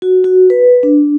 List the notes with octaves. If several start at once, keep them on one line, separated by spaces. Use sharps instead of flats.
F#4
F#4
B4
D4